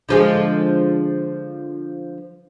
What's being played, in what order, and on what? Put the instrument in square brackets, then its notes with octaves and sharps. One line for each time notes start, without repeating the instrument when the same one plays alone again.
[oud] D3 F3 G#3